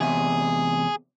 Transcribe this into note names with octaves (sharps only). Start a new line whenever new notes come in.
E2 C3 G#4 E5